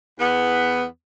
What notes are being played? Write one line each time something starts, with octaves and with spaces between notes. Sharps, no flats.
E2 B3